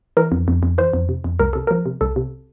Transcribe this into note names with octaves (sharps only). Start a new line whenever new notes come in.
E3 A#4
F2
F2
F2
E3 C5
F2
C3
F2
C2 A#4
C3 A4
F3 A#4
C3
C2 A4
C3